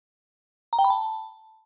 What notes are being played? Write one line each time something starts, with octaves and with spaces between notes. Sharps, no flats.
A#5
G5
B5
A5